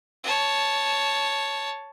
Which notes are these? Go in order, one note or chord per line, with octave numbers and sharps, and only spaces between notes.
C#5 A5